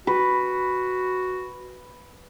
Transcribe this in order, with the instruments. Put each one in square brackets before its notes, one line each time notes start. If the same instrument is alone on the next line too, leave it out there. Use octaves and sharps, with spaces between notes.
[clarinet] F#4 [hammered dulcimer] B4